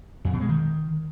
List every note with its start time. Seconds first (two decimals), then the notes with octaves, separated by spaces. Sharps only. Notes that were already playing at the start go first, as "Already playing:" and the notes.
0.25 F2
0.33 B2
0.41 G#3
0.49 D#3